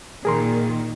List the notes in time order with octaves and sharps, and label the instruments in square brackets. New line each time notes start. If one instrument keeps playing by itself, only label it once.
[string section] A#2 D#3 [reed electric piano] G#4 A#4 C6